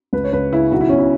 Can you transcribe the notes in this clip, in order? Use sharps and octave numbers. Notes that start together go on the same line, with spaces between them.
C#2 B4
C#5
C#2 B4
C#3 E4
B1 F#4
E4
B2 C#4
E4